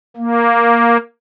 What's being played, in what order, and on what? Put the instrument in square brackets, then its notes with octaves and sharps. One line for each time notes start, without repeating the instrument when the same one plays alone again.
[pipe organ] A#3